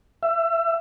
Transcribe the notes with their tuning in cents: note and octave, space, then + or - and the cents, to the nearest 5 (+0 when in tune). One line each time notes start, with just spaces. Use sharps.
E5 +30